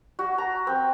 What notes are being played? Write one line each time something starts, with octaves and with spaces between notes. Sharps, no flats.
F#4
A#5
C4